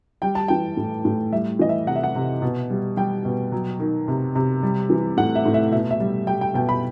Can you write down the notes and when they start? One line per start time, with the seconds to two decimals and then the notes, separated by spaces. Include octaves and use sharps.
0.22 G3 G5
0.35 A5
0.48 E3 G5
0.77 A2
1.05 A2
1.32 G3 E5
1.59 E3 D#5
1.69 E5
1.87 C3 F#5
1.96 E5
2.03 F#5
2.15 C3
2.42 B2
2.70 G3
2.97 G3 G5
3.25 B2
3.52 F#3
3.80 D#3
4.08 C3
4.35 C3
4.63 G3
4.90 E3
5.17 A2 F#5
5.35 E5
5.45 A2
5.54 E5
5.72 B2 E5
5.91 E5
6.00 G3
6.27 G3 G5
6.41 G5
6.54 B2 G5
6.69 B5